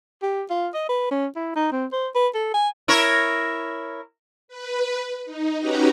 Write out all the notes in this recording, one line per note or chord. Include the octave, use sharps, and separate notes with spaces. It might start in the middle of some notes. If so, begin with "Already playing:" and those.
G4
F4
D#5
B4
C#4
E4
D#4
C4
C5
B4
A4
G#5
E4 A#4 C#5
B4
D#4
C#4 D#4 F#4 G4 B4 A#5